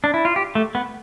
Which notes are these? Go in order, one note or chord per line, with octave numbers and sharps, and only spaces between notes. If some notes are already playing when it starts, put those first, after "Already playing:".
D4
E4
F4
G4
A3
B3